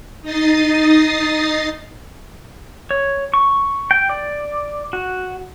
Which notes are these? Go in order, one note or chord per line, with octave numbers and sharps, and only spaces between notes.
D#4 D#5 D#6 A6 C7
C#5
C#6
G5
D5
F#4